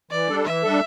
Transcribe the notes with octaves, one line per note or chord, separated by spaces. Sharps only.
E3 D5
G3 D4 A4
E3 E5
G3 D4 A4